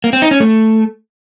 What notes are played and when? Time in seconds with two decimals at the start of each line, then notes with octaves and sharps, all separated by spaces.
0.04 A#3
0.13 C4
0.22 D#4
0.31 C#4
0.40 A3